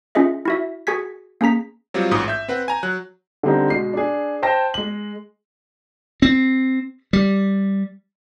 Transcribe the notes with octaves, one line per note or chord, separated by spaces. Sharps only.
C#4 F4 G#4 D#5 E5
E4 F#4 E5
F#4 G#4 G#5 G#6 B6
A#3 C#4 G#4 A#5 B6
F#3 G3 C4 F4
A1 G#2 D#6
E5 G6
C4 B4 F#5
G#5 A#5
F#3 F#6
D3 G3 C4 D#4
B2 G#3 C7
D4 G#4
C5 G5 A5 A#6
G#3 F#7
C4
G3